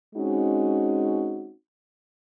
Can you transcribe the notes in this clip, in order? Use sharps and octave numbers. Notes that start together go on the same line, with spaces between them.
G#3 C4 C#4 D#4 F#4